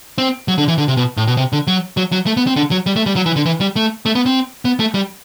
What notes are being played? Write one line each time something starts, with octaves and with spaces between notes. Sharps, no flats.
C4
F#3
D3
E3
D3
C3
B2
A2
B2
C3
D3
F#3
F#3
F#3
A3
B3
C4
D3
F#3
G3
A3
G3
F#3
E3
D3
E3
G3
A3
A3
B3
C4
B3
A3
G3